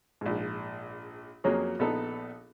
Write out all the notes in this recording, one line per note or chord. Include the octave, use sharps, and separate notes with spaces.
A#1 G#2
F2 F#3 A#3 C#4 F#4 G#4
A#1 B3 D#4 A4